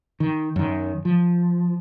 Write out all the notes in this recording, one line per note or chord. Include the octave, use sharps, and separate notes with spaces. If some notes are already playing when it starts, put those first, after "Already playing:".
D#3
F#2 D#3
F3